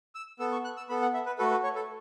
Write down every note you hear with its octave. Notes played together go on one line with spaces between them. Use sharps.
E6
B3 A4 E6
C#6
F#6
E6
B3 A4 B5
F#5
E5
B4
A3 F#4 A4 B4
B4
C#5
A4